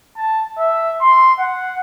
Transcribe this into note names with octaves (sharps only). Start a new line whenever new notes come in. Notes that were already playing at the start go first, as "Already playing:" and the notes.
A5
E5
C6
F#5